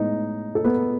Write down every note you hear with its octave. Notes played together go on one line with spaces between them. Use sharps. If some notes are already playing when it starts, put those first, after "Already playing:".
Already playing: A2 G#3 B3 D#4 D#5
A4
B3 B4